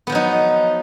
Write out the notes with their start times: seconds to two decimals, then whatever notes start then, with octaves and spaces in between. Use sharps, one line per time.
0.07 B3
0.10 F3
0.12 F#3
0.15 D#4